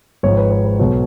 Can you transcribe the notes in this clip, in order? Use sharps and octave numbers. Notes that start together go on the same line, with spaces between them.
G#1 G#2 F3 C#5
B4
B4
B4
B1 B2 F#3 C#5